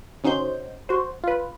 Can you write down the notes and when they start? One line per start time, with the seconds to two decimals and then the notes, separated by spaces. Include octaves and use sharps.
0.24 D3 C#4 D#4 F#4 C5 G6
0.89 F#4 C5
1.24 F4 B4